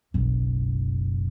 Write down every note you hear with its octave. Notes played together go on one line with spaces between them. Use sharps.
F#1 B1